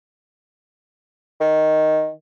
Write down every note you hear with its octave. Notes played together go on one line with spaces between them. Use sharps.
D#3